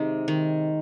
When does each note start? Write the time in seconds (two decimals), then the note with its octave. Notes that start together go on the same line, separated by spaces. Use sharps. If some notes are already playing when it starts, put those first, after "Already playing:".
Already playing: C3 D#3 G#3 D#4
0.28 D#3